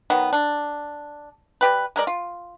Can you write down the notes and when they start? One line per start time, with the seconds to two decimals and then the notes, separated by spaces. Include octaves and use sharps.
0.10 D#3 F#3 B3
0.33 D4
1.61 G3 G4 B4
1.96 G#3 A#4 D5
2.07 F4